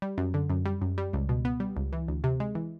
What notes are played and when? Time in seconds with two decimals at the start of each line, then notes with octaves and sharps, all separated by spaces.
0.02 G3
0.18 F#2
0.34 D3
0.50 F#2
0.66 G3
0.82 F#2
0.98 G3
1.13 C#2
1.29 B2
1.45 B3
1.60 G3
1.77 C#2
1.93 E3
2.08 D2
2.24 C3
2.40 G#3
2.55 E3